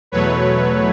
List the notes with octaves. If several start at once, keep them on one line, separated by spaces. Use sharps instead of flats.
E2 B2 F#3 A3 B4 C#5